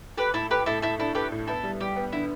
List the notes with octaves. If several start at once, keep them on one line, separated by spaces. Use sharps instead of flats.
G4 A4 B4
A2 E4 A4
G4 A4 B4
A2 E4 A4
A2 E4 A4
D4 E4 A4
G4 A4 B4
A2
B3 E4 A4
G3
G3 G4
B3
D3 E4